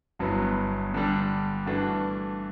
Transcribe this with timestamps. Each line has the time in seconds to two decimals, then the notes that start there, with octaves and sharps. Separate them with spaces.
0.19 G1 G2 F#3 B3 E4
0.94 G2 D3 G3 D4
1.66 G2 E3 A3 D4 F#4